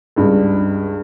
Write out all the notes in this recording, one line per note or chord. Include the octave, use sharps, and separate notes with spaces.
C#2 G2